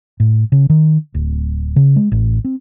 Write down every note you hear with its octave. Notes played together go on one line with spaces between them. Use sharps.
A2
C#3
D#3
D1
C#3
G#3
A1
C4